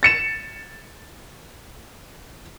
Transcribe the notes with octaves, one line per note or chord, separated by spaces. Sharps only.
A6 C#7 E7